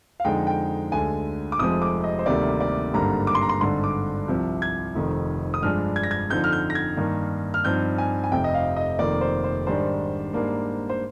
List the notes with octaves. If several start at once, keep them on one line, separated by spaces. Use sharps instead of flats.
F5
F2 D3 G#3 D#4 G5
G5
D2 D3 G#3 G#5
D6
F1 F2 C3 F3 G#3 D#6
D6
D#5
C5
D2 C3 D#3 G3 A#3 D5
D5
G#1 G2 D3 G3 A#3 A#5
D6
C6
A#5
C6
G#1 G2 D3 C6
D6
C2 C3 F3
G#6
F1 F2 D#3
D#6
G2 F3 G#3 D4 F6
G#6
A#6
G#6
F2 D3 F3 C4 D#4 G6
F6
G6
A#6
G#6
G2 D#3 A#3 D#4
F6
G2 F3 C4 D#4 G6
G#5
G#5
F1 F2 C3 G5
D#5
F5
D#5
F1 F2 D#3 A#3 D5
C5
C5
G#2 D#3 G3 D4 C5
G#2 G3 A#3 D4
C5